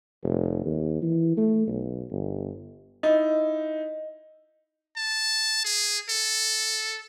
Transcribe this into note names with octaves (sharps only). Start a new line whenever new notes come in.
F1
D#2
E3
A3
B1
G1
D#4 E4 D#5
A5
G#4
A4